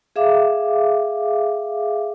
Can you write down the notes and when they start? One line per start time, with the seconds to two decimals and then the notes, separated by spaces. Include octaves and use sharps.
0.16 G#4 E5 F5 D6